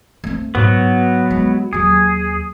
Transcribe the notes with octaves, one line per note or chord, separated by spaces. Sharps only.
A3 C4
G#2 F#3 B3
G#3
D#2 F#3 G#4